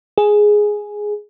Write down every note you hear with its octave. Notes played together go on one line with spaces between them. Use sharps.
G#4